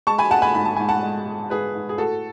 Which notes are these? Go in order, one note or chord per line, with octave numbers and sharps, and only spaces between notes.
G#3 A5 C#6
G#5 B5
G#3 F#5 A5
G#5 B5
G#2 B5
A5
G#2 G#5
F#5 A5
G#3
G#3
G#2 G#4 B4
G#2
G#4
A2 F#4 A4